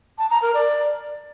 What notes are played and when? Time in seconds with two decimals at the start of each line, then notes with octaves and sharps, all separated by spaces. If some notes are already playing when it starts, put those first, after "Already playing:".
0.18 A5
0.30 A#5
0.42 A#4
0.54 D5